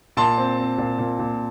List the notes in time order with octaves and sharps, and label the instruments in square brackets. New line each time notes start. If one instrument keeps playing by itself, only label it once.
[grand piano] A#2 A5 C6
C4
C4
A#2
A#2
A#2